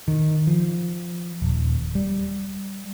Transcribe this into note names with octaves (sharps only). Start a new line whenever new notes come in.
D#3
F3
D#1
G3